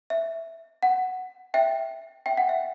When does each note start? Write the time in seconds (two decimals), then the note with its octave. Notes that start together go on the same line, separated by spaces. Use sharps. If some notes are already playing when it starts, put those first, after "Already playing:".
0.10 E5
0.83 F#5
1.54 E5 G5
2.26 E5 G5
2.37 F#5
2.49 E5 G5